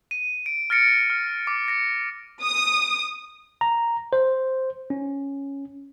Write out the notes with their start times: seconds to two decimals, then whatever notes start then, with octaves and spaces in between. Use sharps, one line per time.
0.11 D#7
0.46 D7
0.70 F6 A6 A#6 C#7 D7
1.10 F6
1.47 D6
1.68 A#6 C#7
2.43 D#6
3.61 A#5
4.13 C5
4.90 C#4